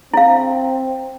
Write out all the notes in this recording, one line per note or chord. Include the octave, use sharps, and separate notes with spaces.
C4 E4 F5